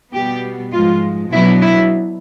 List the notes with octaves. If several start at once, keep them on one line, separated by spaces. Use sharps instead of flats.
B2 G3 B3 G4
G#2 F3 G#3 F4
B2 F#3 B3 D4 E4
E4